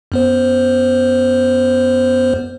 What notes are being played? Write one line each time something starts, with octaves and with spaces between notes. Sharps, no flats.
F#2 B3 C5